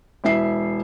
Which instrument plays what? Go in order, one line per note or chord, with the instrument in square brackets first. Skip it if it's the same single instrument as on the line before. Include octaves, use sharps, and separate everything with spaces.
[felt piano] E1 E4 E5 C7